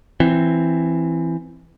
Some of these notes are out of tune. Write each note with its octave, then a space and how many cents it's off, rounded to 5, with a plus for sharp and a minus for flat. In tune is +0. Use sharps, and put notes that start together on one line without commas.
E3 +10 C4 +0